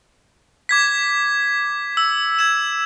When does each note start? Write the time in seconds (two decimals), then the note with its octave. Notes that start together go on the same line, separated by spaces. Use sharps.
0.69 D6 G#6 B6
1.97 E6
2.39 G#6 E7